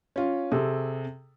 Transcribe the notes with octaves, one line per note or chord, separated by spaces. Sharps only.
C#4 F4
C3 G#4 A4